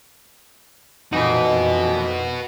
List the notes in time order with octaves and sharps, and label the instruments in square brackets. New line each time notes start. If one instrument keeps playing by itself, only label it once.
[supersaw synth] F2 A#2 [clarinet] E3 [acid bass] D#4 [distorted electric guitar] F#4 B4